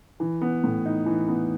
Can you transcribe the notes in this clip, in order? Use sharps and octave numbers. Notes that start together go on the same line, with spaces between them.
E3
B3
A2
D#4
E3
B3